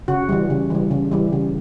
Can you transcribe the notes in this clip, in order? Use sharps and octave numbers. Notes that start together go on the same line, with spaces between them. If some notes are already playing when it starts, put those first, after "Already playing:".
C#3 F#4
E3 G3
C#3
E3 G3
C#3
E3 G3
C#3